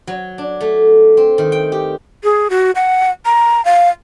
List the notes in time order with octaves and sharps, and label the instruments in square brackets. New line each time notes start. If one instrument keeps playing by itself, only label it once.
[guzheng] F#3
D4
A3
C4
D#3
G5
G4
[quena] G#4
F#4
F#5
A#5
F5